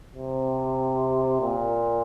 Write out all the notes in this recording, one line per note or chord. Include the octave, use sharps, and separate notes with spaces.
C3
A#2